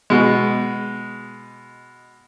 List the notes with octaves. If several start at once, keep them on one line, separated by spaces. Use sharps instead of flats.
B2 G#3